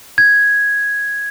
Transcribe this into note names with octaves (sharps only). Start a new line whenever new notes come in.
G#6